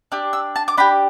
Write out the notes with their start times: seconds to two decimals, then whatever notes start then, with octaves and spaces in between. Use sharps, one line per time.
0.12 D4 G4 E6
0.33 E6
0.56 A5
0.68 D6
0.77 D4 G4 B5